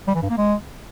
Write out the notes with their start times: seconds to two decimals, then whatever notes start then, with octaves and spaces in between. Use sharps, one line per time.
0.07 G3
0.15 E3
0.23 G2
0.30 A#3
0.38 G#3